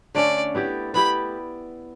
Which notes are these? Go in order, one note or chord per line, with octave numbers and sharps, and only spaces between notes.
D3 A3 C#4 D5
B3 E4 G4 D5
B3 E4 G4 D5 B5